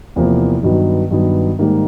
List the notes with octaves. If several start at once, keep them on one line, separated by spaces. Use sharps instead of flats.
E2 C3 F3 A#3
G2 D#3 F#3 B3
G2 D#3 F#3 B3
G#2 D#3 G3 A#3 D#4